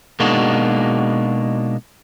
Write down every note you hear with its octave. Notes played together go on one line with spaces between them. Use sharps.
B2 G#3 A#3 D4 D#4 F#4